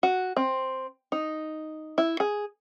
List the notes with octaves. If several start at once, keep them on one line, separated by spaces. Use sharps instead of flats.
F#4
C4
D#4
E4
G#4